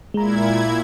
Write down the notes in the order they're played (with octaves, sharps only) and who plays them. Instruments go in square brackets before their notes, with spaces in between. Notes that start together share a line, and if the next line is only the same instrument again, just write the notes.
[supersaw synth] A#2 E4 G#6 [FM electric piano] G#3 A#5